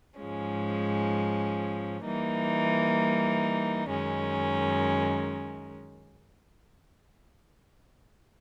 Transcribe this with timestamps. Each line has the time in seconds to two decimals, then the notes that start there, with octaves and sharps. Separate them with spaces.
0.18 G#2 F3 G#3 C#4
2.03 E3 G3 A#3 D#4
3.89 F#2 D#3 G#3 C#4